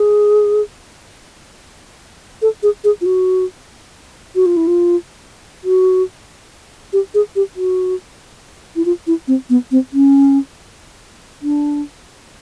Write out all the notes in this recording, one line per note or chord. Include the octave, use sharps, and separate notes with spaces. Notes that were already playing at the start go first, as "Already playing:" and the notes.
Already playing: G#4
A4
G#4
G#4
F4
F#4
F#4
F4
E4
F4
F#4
G4
G#4
G4
F#4
E4
F4
E4
C4
B3
C4
C#4
D4